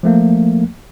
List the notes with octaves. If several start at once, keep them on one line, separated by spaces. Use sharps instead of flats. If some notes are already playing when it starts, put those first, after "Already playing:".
F3 A3 A#3